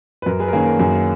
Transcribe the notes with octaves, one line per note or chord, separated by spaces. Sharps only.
B4
F#2 A#4
G#4 B4
A#4
D#3 A#3 C#4 G#4
A#4
F#2 G#4